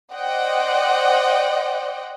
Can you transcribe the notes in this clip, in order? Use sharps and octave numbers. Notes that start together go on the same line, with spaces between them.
C5 D5 D#5 F#5 G5